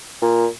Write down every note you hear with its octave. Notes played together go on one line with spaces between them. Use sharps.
A#2